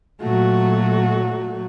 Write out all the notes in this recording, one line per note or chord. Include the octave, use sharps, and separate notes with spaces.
A#2 F#3 A3 F#4